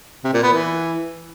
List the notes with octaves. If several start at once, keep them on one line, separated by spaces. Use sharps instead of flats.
C3
A#2
B3
E3